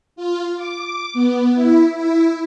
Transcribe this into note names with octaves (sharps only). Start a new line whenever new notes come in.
F4
D6
B3
E4
E4